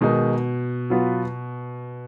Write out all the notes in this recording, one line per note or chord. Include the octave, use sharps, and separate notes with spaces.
B2 D#3 G#3 D#4 A#4
F#3 B3 F4 B4